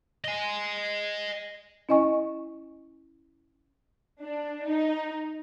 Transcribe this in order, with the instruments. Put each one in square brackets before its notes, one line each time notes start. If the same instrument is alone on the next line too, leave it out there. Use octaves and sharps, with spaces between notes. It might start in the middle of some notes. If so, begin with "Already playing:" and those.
[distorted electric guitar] D#5 G#5
[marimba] C#4 E4 D#5 G#5 C#6
[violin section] D4
D#4